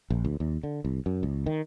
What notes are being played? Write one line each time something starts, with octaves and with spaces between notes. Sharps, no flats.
A#1
D2
D#2
D3
C2
F#2
C#2
D#3